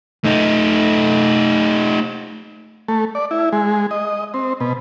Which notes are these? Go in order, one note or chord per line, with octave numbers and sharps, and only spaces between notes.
A3 D#4
A3
D5
E4
G#3
D#5
C4
B2